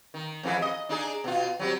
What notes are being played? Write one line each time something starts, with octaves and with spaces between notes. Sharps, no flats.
D#3
F2 E3 G#3
D#5
D4 D#4 G#4
B2 F4
F#3 G3 C4